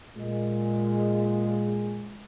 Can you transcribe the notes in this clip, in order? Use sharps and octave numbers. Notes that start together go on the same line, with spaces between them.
A#2 G#3